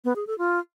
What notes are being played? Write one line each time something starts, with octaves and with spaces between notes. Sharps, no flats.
B3
G#4
A4
F4